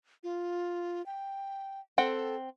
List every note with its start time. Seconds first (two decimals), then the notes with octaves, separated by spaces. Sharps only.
0.23 F4
1.06 G5
1.98 C4 A4 F#5 G5